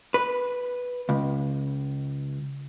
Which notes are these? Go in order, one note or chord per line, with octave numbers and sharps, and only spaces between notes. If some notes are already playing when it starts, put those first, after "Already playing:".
B4
C#2